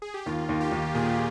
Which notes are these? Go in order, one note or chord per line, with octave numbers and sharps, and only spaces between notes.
G#4
G4
D#2 F4
D#2
G4
D#2
A#2 G#4